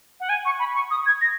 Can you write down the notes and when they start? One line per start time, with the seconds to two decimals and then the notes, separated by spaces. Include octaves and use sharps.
0.20 F#5
0.29 G#5
0.45 C#6
0.59 B5
0.75 C#6
0.91 D#6
1.06 G#6
1.21 A#6